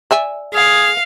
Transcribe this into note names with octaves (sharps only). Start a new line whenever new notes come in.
D5 E5 G#5
G#4 F5